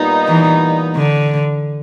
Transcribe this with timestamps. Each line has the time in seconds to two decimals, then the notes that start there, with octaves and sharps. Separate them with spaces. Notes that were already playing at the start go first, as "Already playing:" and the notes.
Already playing: A#2 G3 B3 D#4
0.27 E3
0.96 D3